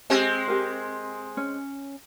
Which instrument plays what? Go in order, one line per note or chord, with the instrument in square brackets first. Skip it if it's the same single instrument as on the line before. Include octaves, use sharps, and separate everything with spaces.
[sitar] G#3 C4 [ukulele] G4
[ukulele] G4 A#4
C#4